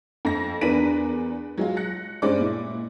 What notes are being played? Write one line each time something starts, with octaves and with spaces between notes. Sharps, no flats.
F2 A#6
E2 D4 A#4 B4 B6 D#7
F#3 G#3 F4
F#6 A#6 C#7
G2 G#3 C#4 C5 D5 D6
A#2 E4